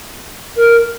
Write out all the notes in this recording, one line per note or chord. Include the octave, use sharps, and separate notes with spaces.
A#4